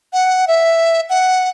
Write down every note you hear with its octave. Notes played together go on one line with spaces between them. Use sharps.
F#5
E5
F#5